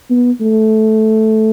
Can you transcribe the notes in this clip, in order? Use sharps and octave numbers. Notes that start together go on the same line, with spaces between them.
B3
A3